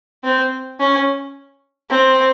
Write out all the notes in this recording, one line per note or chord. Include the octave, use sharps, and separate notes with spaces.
C4
C#4
C4